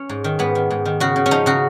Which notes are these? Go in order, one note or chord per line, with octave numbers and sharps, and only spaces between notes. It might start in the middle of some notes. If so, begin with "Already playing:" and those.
Already playing: C#4
G#2
D#3
G#2 B3
D#3
G#2
D#3
C#3 F#4
C#3
C#4
F3 D#4
C#3 F#4